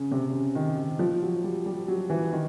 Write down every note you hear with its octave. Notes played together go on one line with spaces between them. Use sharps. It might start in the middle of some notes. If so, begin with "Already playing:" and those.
Already playing: C#3
C3
C#3
D#3
D#3
F3
F#3
G3
G3
F#3
E3
D#3